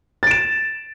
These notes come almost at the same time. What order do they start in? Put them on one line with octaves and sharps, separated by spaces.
A6 D7 E7